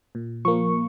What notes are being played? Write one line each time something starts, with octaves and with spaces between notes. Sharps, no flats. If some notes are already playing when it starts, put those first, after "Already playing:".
A#2
F3 A#3 C#6